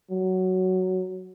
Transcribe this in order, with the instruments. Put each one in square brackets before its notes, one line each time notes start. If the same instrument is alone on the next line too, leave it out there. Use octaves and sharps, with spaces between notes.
[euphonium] F#3